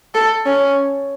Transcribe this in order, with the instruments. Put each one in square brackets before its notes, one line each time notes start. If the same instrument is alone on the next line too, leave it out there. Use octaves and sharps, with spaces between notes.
[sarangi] A4
C#4